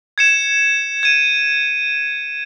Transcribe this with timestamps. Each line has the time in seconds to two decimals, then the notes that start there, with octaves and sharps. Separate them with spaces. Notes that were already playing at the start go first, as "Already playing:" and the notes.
0.18 G#6 C#7 E7
1.03 G#6 D#7